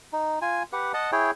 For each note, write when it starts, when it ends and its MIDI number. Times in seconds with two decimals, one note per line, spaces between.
0.13 0.39 63
0.42 0.63 65
0.42 0.63 80
0.73 0.92 67
0.73 0.92 71
0.73 0.92 78
0.94 1.11 75
0.94 1.11 78
0.94 1.11 81
1.12 1.31 64
1.12 1.31 68
1.12 1.31 73
1.12 1.31 79